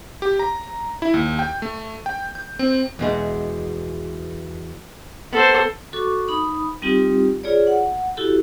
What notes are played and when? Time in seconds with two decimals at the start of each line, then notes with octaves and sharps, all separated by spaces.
0.22 G4
0.39 A#5
1.02 E4
1.14 D#2
1.39 G5
1.62 A3
2.06 G5
2.35 G6
2.59 C4
2.99 E2 B2 G#3
5.33 B3 A4 C5
5.93 F#4 A4 C#6 D6
6.28 D#4 B5 D#6
6.82 G3 C4 D#4 F4 G4
7.44 F4 G#4 C#5 D5
7.67 F#5
8.17 E4 F#4 G4 A4